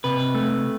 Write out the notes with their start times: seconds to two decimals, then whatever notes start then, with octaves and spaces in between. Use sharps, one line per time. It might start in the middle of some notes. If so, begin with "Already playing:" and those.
0.04 C3 B4
0.35 A3